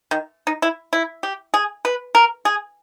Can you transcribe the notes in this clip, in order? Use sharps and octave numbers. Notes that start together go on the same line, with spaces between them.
D#3
D#4
E4
E4
G4
G#4
B4
A#4
G#4